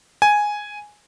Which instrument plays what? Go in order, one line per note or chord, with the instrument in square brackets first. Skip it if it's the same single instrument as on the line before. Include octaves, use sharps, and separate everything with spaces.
[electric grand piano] G#5